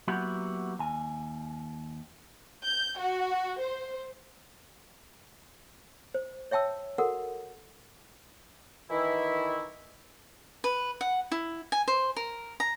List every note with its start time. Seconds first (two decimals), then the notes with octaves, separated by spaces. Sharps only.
0.08 F#3 A#3 B3 E4 F#4 G4
0.79 D#2 G#5
2.65 G6
3.00 F#4
3.62 C5
6.14 C5
6.51 C#5 E5 G5 A5 E6
6.98 F#4 A4 A#4 F#5
8.90 D#3 E3 E4
10.64 B4
11.01 F#5
11.31 E4
11.72 G#5
11.88 C5
12.16 A#4
12.60 A#5